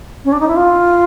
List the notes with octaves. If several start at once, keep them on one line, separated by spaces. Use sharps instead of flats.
C#4
D4
D#4
E4
F4